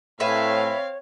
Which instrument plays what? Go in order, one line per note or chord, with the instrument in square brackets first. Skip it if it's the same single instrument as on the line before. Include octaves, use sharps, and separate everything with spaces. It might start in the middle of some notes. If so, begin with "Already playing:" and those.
[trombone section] A2 [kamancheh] C4 F5 [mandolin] B4 E5 G#5 [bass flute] C#5